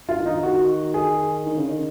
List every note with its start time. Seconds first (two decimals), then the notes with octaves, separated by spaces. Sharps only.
0.09 F4
0.16 D#3
0.26 D#4
0.43 F#4
0.94 G#4
1.46 D#3
1.57 C#3
1.67 D#3